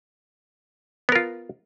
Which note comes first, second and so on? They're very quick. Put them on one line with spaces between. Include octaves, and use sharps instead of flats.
B3 A#4 F4